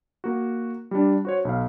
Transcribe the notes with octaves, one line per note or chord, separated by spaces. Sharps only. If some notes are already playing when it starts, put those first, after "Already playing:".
A#3 F#4
G3 D4
F#4 C5 C#5
B1 F5